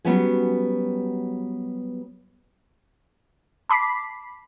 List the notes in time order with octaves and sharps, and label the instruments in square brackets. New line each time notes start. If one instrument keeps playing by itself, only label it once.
[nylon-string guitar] F#3 G3 B3 C#4 F#4 G#4
[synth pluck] A5 B5 D6 B6 C7